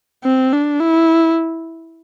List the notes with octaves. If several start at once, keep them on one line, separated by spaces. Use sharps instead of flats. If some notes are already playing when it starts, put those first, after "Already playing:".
C4
D4
E4